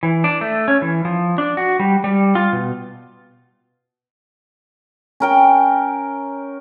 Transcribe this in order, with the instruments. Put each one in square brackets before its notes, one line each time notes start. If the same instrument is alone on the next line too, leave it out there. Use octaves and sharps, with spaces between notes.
[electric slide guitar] E3
D4
A3
C#4
E3
F3
D4
F#4
G3
G3
F4
B2
[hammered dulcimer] C#4 A#4 G5